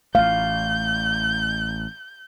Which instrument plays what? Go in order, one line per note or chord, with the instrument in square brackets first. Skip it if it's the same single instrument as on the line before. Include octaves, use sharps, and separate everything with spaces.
[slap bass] A1 A3 [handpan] F5 [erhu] G6